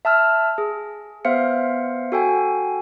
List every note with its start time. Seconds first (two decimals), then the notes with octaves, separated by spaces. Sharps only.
0.05 E5 A5 E6 F6
0.58 G#4
1.25 B3 C5 E5 F5 C#7
2.12 F#4 A4 G5 G#5